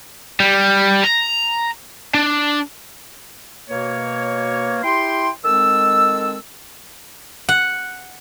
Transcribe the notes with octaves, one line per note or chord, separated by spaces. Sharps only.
G3
A#5
D4
B2 A#3 C#5
E4 G4 G5 C6
D#3 G#3 C4 A4 E6
F#5